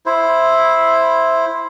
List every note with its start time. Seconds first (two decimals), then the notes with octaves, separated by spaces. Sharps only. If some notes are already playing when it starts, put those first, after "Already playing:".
0.06 E4 C5